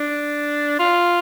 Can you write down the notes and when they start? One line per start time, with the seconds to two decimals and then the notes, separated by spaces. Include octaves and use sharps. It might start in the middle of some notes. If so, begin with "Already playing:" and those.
Already playing: D4
0.79 F4